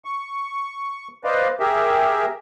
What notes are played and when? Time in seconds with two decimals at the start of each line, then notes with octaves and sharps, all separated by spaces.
0.05 C#6
1.24 B4 C5 D5 D#5 F5
1.60 G4 G#4 A#4 E5